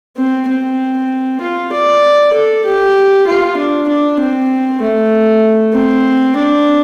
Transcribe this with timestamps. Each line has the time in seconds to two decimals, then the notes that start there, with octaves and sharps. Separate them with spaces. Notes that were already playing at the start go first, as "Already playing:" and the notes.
0.17 C4
0.48 C4
1.41 F4
1.72 D5
2.33 A4
2.65 G4
3.26 F4
3.57 D4
3.89 D4
4.19 C4
4.81 A3
5.73 C4
6.36 D4